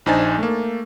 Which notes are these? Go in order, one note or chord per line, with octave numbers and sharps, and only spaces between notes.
A#1 D4 D#4 C5 G#5 A6
A3 A#3